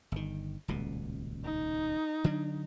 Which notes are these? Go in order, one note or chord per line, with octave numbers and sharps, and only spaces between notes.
G1 D#3
D#1 C#2 B2
D#4
D3 F#3 D4